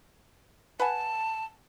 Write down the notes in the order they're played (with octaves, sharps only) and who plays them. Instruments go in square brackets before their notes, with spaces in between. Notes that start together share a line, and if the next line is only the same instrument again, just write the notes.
[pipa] B4 F#5 G#5 [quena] A5